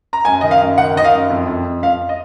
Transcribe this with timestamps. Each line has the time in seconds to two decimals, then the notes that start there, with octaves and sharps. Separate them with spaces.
0.13 A#5
0.25 F#2 G#5
0.41 D#3 D#5
0.51 F5
0.61 F#2
0.78 D#3 F#5
0.96 D#3 D#5
1.05 F5
1.13 F#2
1.30 F2
1.47 F2
1.64 F2
1.82 F2 F5
2.09 D#5